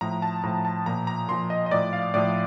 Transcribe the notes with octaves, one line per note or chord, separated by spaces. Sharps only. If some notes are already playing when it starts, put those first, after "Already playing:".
A2 F3 A#5
A5
A2 F3 A#5
A5
A#2 F3 A#5
A#5
A#2 F3 C6
D#5
D#5
A2 F3 D5
F5
A2 F3 D5